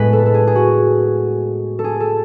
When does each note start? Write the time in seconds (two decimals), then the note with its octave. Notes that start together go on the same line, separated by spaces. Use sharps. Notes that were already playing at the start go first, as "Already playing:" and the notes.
Already playing: A2 G#3 B3 B4
0.13 A4
0.26 A4
0.34 G#4
0.47 G#4
0.55 F#4
1.79 A4
1.84 G#4
2.00 A4